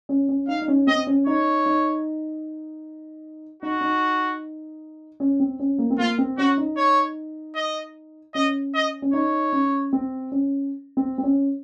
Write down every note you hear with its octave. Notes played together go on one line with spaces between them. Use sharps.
C#4
C#4
D#4 F5
D#4
C#4
C4 D#5
C#4
D#4 C#5
D#4
D#4 F#4
D#4
C#4
C4
C#4
A#3
C4
A#3 F4
C4
C#4 F#4
D#4
C#5
D#5
C#4 D#5
D#5
C#4
D#4 C#5
C#4
C4
C#4
C4
C4
C#4